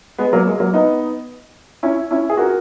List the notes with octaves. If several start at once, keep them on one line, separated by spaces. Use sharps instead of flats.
G#3 B3
F#3 A#3
G#3
F#3 A#3
B3 D#4
C#4 E4
C#4 E4
G#4
F#4 A#4